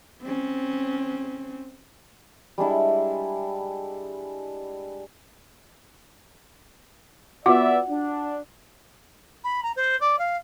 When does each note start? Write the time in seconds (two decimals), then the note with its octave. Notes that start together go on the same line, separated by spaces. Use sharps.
0.23 C4 C#4
2.58 G3 G#3 D4 E4
7.46 B3 F4 F#4 D5 E5 F#5 D6
7.90 D4
9.44 B5
9.63 A#5
9.76 C5
10.00 D5
10.18 F5